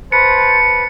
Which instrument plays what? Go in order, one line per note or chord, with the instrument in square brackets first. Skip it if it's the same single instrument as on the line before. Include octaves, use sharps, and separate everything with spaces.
[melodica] B4 [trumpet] C5 [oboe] A5 [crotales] C#7